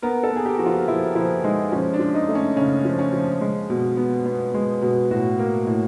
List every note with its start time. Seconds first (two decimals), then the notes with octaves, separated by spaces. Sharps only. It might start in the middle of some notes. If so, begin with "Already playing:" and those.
0.02 B3 A#4
0.23 A4
0.30 B3
0.36 G#4
0.45 G4
0.58 F3 F#4
0.66 F4
0.88 F3 E4
1.15 F3 E4
1.44 G#3 D#4
1.72 F3 C#4
1.94 D4
2.00 F3
2.14 D#4
2.29 A3
2.35 C#4
2.56 C#3 C#4
2.85 F3
2.99 C#4
3.13 F3
3.41 G#3
3.70 B2
3.97 B3
4.25 B3
4.54 G#3
4.82 B2
5.11 A2 F#4
5.39 A#3
5.67 A2